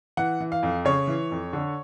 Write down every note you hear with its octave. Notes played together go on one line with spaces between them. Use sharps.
E3 F#5
E3
F5
F2
C#3 C#5
E3
F2
D3